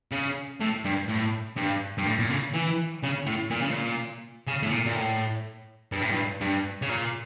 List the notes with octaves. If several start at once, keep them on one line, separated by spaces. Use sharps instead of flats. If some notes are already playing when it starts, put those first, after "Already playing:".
C#3
A2
G2
A2
G2
G2
A2
A#2
C#3
E3
C#3
A2
A#2
C#3
A#2
C#3
A2
A#2
A#2
A2
G2
A2
G2
G2
C#3
A#2